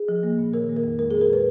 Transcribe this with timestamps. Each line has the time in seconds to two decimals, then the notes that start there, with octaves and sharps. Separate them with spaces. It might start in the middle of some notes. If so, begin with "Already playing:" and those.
Already playing: G#4
0.09 F3
0.23 A#3
0.38 A#2
0.53 D#3 A#4
0.69 A#3
0.76 A#4
0.84 F2
0.99 G#3 A#4
1.11 A#2 G#4
1.21 A#4
1.30 A#2 B4